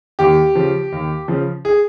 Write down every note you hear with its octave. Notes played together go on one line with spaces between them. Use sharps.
D#2 G4
C#3 F3
D#2
C#3 F3
G#4